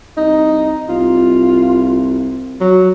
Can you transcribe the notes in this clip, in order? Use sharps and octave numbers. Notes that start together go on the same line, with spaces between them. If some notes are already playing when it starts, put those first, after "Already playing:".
C2 D#4
C2 F4
F#3